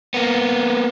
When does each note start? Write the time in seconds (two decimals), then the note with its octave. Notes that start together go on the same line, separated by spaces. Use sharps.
0.14 A#3 B3